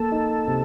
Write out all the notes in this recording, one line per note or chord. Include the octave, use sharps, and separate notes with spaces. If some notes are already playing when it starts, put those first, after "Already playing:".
Already playing: A#3 A4
D#4
C3